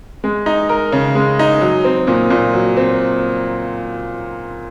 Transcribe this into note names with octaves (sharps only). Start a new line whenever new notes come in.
G#3
D#4
A#4
C#3
G#3
D#4
F#3
C4
A#2
A#2
F#3
C4